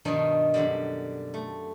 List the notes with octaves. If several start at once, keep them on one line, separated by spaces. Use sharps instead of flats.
G2 B2 D#3 F3 D4 D#4
F#2 D3 G3
A3